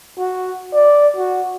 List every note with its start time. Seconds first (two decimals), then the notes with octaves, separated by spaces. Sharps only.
0.18 F#4
0.74 D5
1.17 F#4